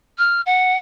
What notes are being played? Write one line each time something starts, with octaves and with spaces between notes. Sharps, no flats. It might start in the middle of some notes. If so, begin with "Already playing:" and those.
F6
F#5